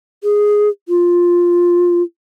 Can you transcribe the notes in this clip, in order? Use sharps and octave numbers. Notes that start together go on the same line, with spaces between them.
G#4
F4